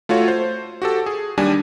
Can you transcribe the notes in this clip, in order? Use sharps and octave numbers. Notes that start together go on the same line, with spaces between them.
A3 F4 F#4 C#5
C5
F#4 G4 A4
G#4
D#2 G3 D4 G#5